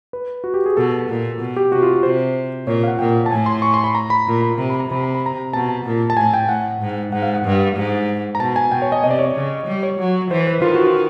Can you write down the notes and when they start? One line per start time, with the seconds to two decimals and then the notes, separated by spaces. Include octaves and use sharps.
0.13 B4
0.44 F#4
0.54 G4
0.66 G#4
0.76 B2 A4
1.09 A#2
1.40 B2
1.57 G4
1.71 C3 F#4
1.82 F4
1.94 F#4
2.03 C3 C5
2.67 A#2 C#5
2.83 F5
2.88 F#5
2.99 A#2 G5
3.26 A5
3.31 A2 G#5
3.46 C6
3.62 C#6
3.74 C6
3.84 B5
3.95 A#5
4.10 B5
4.27 A#2
4.42 B5
4.58 C3 A#5
4.70 B5
4.80 A#5
4.90 C3 B5
5.03 A#5
5.15 B5
5.26 A#5
5.53 B2 A5
5.85 A#2
6.10 A5
6.17 A2 G#5
6.34 G5
6.48 A2 F#5
6.81 G#2
7.12 G#2 F#5
7.22 F5
7.34 F#5
7.45 G2
7.76 G#2
8.35 A#5
8.39 B2 A5
8.56 G#5
8.72 B2 G5
8.82 C#5
8.92 D#5
9.03 C3 D#5
9.11 D5
9.19 C#5
9.27 D5
9.35 C#3
9.66 G3
9.83 C#5
9.99 F#3
10.30 E3 C5
10.47 B4
10.62 D#3 F4
10.75 F#4
10.87 F4